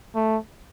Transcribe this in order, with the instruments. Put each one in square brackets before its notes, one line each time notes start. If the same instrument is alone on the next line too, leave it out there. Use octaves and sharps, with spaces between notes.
[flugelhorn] A3